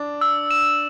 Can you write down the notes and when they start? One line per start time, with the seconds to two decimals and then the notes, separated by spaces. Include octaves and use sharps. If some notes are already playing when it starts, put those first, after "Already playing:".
Already playing: D4
0.21 E6
0.51 E7